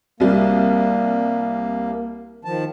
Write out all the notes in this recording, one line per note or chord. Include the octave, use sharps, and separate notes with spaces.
C2 G3 A#3
D#3 F3 A5